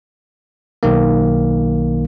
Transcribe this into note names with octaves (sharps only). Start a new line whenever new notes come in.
B1 D#3 A#3